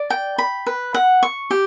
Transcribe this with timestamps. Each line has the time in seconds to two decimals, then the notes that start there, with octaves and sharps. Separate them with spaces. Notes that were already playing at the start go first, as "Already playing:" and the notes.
Already playing: D5
0.10 G5
0.38 B5
0.67 B4
0.94 F#5
1.23 C#6
1.51 G4